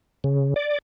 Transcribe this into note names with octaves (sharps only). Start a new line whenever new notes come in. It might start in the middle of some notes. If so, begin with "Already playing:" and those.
C#3
D5